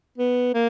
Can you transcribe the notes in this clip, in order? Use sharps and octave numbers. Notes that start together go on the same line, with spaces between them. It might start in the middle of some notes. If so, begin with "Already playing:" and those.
B3
A#3